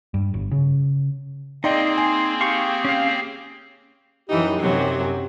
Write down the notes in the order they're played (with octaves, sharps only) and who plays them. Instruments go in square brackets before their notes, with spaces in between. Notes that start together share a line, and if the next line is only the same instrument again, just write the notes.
[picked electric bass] G2
G1
C#3
[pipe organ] A#3 C4 G#4 [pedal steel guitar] D#4 [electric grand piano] D5 D#5 G5 [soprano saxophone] C6
[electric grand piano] G#5
[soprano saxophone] G4 [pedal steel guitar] F5 C6 C#6
[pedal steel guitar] C#4 F5
[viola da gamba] F#2 E3 D#4 [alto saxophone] G4
[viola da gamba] F#2 C3 F#3